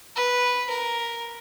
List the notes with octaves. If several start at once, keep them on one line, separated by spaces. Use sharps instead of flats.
B4
A#4